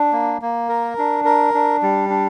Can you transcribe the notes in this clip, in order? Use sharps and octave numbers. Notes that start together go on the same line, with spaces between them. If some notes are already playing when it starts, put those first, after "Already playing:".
Already playing: D4
A#3
A#3
A#4
D4
A#4
D4
G3
D4